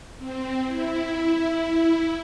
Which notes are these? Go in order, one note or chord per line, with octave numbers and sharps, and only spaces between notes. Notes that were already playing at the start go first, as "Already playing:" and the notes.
C4
E4